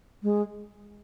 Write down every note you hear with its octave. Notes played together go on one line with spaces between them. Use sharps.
G#3